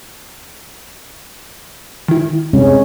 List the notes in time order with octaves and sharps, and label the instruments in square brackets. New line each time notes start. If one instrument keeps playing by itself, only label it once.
[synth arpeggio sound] D#3 E4
[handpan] C3 G#3 C#4